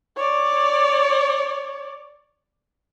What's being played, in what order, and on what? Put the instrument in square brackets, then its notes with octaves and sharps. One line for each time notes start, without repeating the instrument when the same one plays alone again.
[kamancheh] C#5 D5